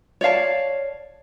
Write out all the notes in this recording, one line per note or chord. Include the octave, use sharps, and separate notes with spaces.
C#5 D5 F5 A5